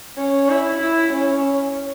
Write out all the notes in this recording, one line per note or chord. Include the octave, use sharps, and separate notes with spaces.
C#4
E4
E4
C#4